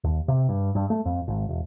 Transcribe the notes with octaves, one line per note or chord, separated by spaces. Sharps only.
D#2
C3
G2
G2
A3
F2
G#1
E1